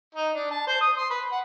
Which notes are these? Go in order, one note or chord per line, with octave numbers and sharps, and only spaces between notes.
D#4
D4
A5
C5
D#6
C6
B4
F#5